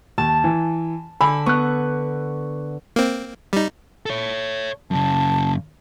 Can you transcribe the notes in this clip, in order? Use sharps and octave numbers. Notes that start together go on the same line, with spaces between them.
D#2 A5
E3
D3 G#5 B5 E6
B3 C#6 F#6
A#3 C4
G3 D#4
A4 C#5
F#2 C#3 A5